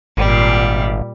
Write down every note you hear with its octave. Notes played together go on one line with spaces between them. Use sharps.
G#1 A#2 G3